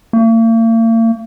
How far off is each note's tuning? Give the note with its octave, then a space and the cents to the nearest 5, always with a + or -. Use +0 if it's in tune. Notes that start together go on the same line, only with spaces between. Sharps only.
A#3 -45